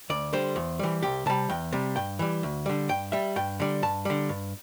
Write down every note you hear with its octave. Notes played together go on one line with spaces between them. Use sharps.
D2 D5
D3 G3 C5
E2
E3 G3
C2 G4
C3 G3 A5
E2 G5
C3 G3
G2 G5
E3 G3
D2
D3 G3
G2 G5
G3 E5
G2 G5
D3 G3
G2 A5
D3 G3
G2